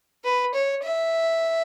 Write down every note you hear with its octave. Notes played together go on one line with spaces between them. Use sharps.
B4
C#5
E5